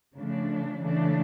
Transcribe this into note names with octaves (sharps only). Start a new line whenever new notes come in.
C#3 F3 A3 D4
C#3 E3 A3 D4